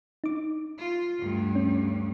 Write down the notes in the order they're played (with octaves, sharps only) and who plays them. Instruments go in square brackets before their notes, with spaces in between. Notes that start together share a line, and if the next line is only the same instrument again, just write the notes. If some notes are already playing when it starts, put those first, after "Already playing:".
[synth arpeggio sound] D#4 D6
[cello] F4
D2 G2
[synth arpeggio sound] C#4